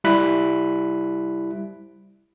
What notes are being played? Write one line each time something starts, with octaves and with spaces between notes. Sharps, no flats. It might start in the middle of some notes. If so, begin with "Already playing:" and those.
G3 E4 F#6 B6